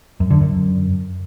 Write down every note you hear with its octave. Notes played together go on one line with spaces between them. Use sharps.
F#2
D3
F#2